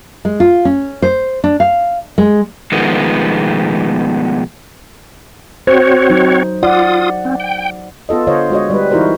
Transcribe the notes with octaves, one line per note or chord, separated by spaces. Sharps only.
G#3
F4
C#4
C5
D4
F5
G#3
B2 D#3 F3 G#3 A3 B3
C4 F#4 C5 C#5
F#3 D#4
F4 D5 F#5 D#6
C4
G5
B3 F4 A4 D#5
D3 F4 C5 C#5 D#5 F5
G#3 F#4 C#5 D#5
G3 B4
E3 D#4 E4 F#4 A#4 C5